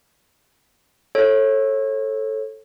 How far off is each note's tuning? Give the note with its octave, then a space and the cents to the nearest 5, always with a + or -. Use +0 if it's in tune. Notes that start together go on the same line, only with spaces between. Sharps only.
A4 +0 C#5 -30